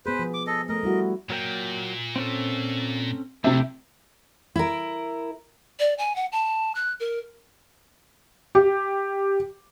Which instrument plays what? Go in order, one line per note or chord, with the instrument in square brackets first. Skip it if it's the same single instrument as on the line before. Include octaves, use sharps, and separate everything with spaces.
[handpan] B3 G#4 [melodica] B4 C5
[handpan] F3
[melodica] D6
A4 D#5
[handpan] A3 [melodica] A#4 D#5
[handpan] G3 E4 F#4
[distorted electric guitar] A#2 [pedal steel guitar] F#3 A#4 G5
[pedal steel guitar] C4 C#4 A4
[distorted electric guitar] F2 [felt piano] C3 C4 E5 [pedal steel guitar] A3 E4 G4
[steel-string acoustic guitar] E4 A#4
[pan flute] D5
G#5
F#5
A5
F#6
A#4
[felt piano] G4